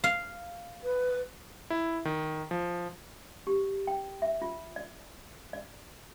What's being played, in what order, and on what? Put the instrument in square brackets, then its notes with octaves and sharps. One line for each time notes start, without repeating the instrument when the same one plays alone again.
[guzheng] F5
[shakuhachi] B4
[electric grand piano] E4
D#3
F3
[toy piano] G4
G5
E5
F4
D5
D5